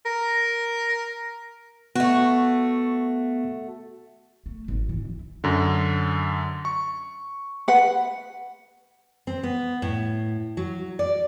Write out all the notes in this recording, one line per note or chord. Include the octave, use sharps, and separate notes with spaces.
A#4
A3 B3 F#4
A3
G#1
E3
E4
F#2 D3
C#6
B4 F#5
C4
B3
A2
F#3
D5